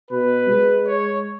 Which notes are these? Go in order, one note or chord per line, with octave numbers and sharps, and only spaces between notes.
B2 B4
G#3
C#5